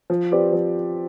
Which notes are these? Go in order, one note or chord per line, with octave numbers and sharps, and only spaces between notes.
F3
C4 G4 B4 D5
F3